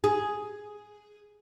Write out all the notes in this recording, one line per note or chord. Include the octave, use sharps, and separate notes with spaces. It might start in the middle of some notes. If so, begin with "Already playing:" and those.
G#4